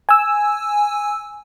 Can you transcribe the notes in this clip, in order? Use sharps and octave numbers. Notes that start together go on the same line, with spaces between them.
G#5 E6